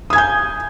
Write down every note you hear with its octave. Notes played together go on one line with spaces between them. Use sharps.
G#5 D#6 G6 G#6